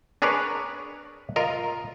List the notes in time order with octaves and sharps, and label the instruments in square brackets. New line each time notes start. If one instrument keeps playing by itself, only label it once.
[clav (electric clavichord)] D4 G#4 A#4 B4 C#5 D5
F4 A#4 D#5